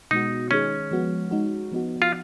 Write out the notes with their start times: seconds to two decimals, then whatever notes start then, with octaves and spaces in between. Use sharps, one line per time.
0.11 B2 G#3 B3 D#4 F#4
0.51 D#3 G#3 C#4 D#4 G#4
0.91 F3 G#3 B3 F#4
1.31 G#3 D#4 F#4
1.72 F3 B3 D#4 F#4
2.02 F4